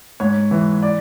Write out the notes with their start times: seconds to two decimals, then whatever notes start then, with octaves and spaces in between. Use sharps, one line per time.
0.20 G#2 C#5
0.51 E3
0.82 D5